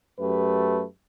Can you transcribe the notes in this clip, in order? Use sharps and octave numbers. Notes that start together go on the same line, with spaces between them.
F#2 A3 G4 B4